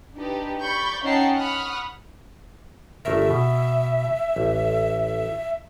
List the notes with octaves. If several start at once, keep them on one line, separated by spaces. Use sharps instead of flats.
D4 D#4 G4 B4
D5 B5 C#6 G6
C#4 D#4 F#5 G5 A5 C7
F#5 B5 C#6 D#6 F6 F#6
G1 A3 A#4 E5
B2
A1